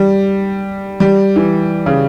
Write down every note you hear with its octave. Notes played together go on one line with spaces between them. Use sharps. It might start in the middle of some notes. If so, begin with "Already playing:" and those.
Already playing: G3
G3
E3
C#3